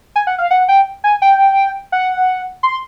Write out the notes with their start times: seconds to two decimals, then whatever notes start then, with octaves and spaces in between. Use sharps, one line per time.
0.16 G#5
0.27 F#5
0.38 F5
0.51 F#5
0.68 G5
1.04 G#5
1.22 G5
1.92 F#5
2.63 C6